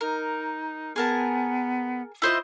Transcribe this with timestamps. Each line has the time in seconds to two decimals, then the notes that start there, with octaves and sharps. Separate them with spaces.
0.01 D#4 A#4
0.96 B3 G#4 A#4 A5
2.22 E4 F4 C5 D#5